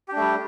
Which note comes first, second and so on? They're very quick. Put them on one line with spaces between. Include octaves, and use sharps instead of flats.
G4 D4 A3 G3